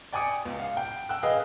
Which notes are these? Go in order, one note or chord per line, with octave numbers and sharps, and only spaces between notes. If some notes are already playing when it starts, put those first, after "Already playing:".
D5 G5 G#5 D6 D#6 C#7
C#2
F5
G5
G5 E6 F#6
G#4 B4 D#5 F5